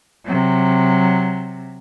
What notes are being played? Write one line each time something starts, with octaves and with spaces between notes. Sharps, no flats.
C3 F#3